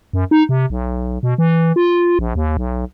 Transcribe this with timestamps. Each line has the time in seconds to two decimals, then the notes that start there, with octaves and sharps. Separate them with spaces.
0.13 F#2
0.31 D#4
0.49 C3
0.70 B1
1.23 B2
1.38 E3
1.76 F4
2.19 A#1
2.36 D#2
2.57 B1